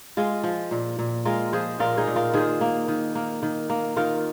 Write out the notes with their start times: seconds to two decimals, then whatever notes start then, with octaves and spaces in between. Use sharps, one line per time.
0.17 G#3 F4
0.43 F3
0.71 A#2
0.99 A#2
1.25 G#3 F4 A#4
1.53 F3 G#4 C5
1.79 A#2 F4 A#4
1.97 D#4 G#4
2.07 A#2
2.16 F4 A#4
2.33 D#3 G#4 C5
2.61 A#3
2.88 D#3
3.15 A#3
3.43 D#3
3.70 A#3
3.97 D#3 F4 A#4